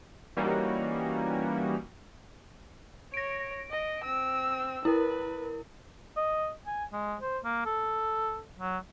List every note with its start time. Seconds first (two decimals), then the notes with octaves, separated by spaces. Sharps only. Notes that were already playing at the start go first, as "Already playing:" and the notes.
0.37 E3 G3 A#3 C#4 D#4 F#4
3.14 C#5 A#6 D7
3.71 D#5
4.04 C4 E6
4.85 E4 A#4 B4
6.17 D#5
6.67 G#5
6.92 G#3
7.21 C5
7.44 A#3
7.66 A4
8.59 F#3